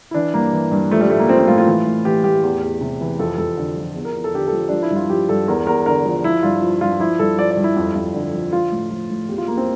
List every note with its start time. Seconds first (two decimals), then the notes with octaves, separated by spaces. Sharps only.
0.11 E4
0.14 E3 D4
0.34 G2 A#3
0.53 E3
0.71 G2
0.91 F3 A3
1.01 G3
1.10 A2 A3
1.19 A#3
1.28 F3 C4
1.39 C4
1.48 A2 F4
1.58 F4
1.68 E3
1.86 A2
2.05 E3 G4
2.24 A2 G4
2.43 E2
2.62 E2
2.81 C3
3.01 E3
3.19 F2 A4
3.38 F2 A4
3.57 D3
3.76 F3
3.96 E2
4.05 A#4
4.14 E2
4.24 A4
4.34 D3 G4
4.48 F3 A4
4.69 F3 D4
4.82 E4
4.91 G2
4.96 F4
5.09 F3 G4
5.29 G2 A4
5.48 E2 A#4
5.67 E2 A#4
5.86 D3 A#4
6.05 F3
6.24 F3 E4
6.43 G2 F4
6.62 F3
6.81 G2 F4
7.00 F3 E4
7.19 G2 A4
7.38 F3 D5
7.51 D5
7.57 G2
7.64 E4
7.77 F2
7.96 F2
8.14 D3
8.34 F3
8.53 F3 F4
8.72 A2
8.90 F3
9.10 A2
9.29 E2 G4
9.38 F4
9.48 E2 A#3
9.57 C4